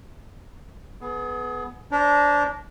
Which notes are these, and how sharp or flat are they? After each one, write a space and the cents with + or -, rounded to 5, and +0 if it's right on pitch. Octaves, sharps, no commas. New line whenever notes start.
B3 +5 G#4 +30
D4 -20 C5 +0 A#5 -5